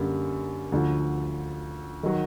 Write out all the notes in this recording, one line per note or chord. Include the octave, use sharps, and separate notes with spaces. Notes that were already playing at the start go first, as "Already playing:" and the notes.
Already playing: F#2 D3 G3 A#3
D2 D3 F3
D#3 F#3